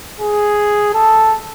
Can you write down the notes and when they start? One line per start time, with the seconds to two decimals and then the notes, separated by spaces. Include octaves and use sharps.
0.20 G#4
0.94 A4